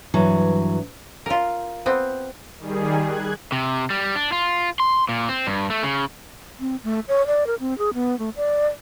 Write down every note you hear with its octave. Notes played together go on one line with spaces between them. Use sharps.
G2 E3 F#3
F4 A#4
B3 C4
D#3 G3 G#4
F#6 G#6
C3
G3
D4
F4
C6
A#2
C4
G2
A3
C#3
C4
A3
C#5
D5
A#4
C4
G#4
B3
A3
D5